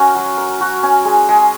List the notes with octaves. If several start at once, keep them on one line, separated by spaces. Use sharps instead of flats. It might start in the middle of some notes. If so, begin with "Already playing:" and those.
Already playing: C#4 F#4 A#4
F#3
A#4
F#4
C#4
G#3
G#3